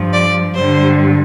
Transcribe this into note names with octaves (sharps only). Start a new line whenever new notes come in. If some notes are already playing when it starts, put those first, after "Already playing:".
Already playing: G2 F3
D5
G2 D3 G3 C5